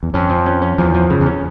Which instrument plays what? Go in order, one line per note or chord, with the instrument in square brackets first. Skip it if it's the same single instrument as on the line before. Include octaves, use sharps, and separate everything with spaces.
[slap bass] E2
[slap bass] F2 [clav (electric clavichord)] C#4
[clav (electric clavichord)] F3
C#4
C#4
[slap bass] E2 [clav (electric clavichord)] F3
[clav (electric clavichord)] F3
[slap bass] F2 [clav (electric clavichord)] C#3
[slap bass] E2
[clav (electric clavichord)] C#4